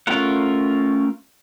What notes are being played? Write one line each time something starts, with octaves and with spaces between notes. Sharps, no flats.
A3 C#4 F4 A#4 F#5